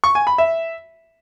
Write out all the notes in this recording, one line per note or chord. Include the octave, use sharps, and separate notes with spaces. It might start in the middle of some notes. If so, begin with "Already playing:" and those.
C#6
G#5
B5
E5